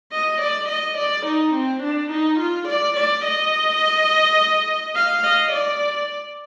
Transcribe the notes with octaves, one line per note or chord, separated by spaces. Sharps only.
D#5
D5
D#5
D5
D#4
C4
D4
D#4
F4
D5
D5
D#5
F5
D#5
D5